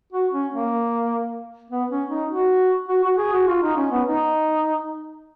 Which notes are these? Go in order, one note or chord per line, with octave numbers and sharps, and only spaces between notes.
F#4
C#4
A#3
B3
C#4
D#4
F#4
F#4
F#4
G#4
F#4
F4
D#4
C#4
B3
D#4